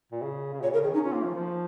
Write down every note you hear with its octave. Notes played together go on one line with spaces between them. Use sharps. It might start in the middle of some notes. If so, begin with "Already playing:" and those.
A#2
C#3
C#3
A#2 C#5
C#3 A#4
D#3 G#4
C#4 D#4
C#4 F4
A#3
F3
F3